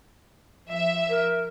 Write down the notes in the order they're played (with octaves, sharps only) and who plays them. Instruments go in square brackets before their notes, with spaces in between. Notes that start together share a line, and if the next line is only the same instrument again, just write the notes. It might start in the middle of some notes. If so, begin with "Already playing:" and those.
[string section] F3 E5
[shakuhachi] A#4